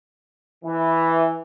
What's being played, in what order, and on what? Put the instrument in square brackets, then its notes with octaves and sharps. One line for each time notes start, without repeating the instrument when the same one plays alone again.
[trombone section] E3